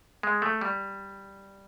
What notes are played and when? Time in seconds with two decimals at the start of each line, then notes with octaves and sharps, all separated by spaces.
0.23 G#3
0.42 A3
0.61 G3